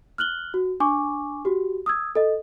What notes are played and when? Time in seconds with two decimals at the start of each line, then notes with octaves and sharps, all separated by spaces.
0.18 F6 F#6 F#7 G7
0.54 F#4
0.80 D4 G#5 C#6 D6
1.45 F#4 G4
1.86 D#6 E6 G#6
2.15 A4 D#5